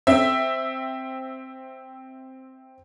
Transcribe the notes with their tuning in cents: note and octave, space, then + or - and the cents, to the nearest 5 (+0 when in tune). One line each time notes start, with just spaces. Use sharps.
C4 +0 E5 +0